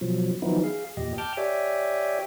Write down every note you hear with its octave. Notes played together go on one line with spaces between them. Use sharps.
B2 F3 F#3
D#3 F3 F#3 B3 D#4 E4
G#4 F5
E2 A#2 G4 D#5
G5 A5 D6 F6 G6
G4 C#5 D5 E5 G5 G#5